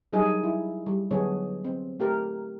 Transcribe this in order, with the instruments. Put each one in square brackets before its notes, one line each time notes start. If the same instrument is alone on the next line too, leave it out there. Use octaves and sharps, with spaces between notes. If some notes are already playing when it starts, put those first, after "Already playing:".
[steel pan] F#3 G3 D4 D#4 G#4 A#4
E4
G3
D3 F#3 B3 D4 G#4 C#5
C4
A3 G4 A#4